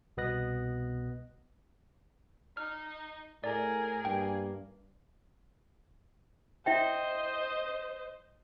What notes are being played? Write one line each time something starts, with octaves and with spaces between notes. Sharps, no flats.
C2 B2 B3 D#5 F#6 A#6
D#4 F6
A2 G#4 A#4 D5
G2 A#3 G5
E4 C5 D#5 E5 G5